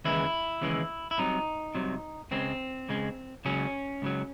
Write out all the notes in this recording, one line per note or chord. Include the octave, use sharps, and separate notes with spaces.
D#2 C#3 E3 G#3 E4
D#2 C#3 E3 G#3
E4
C2 C3 F#3 D#4
C2 C3 F#3
C#2 C#3 G#3 C4
C#2 C#3 G#3
C#2 C#3 F#3 C#4
C#2 C#3 F#3